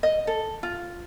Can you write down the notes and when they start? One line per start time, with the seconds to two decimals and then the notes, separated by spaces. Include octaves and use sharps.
0.03 D#5
0.27 A4
0.63 F4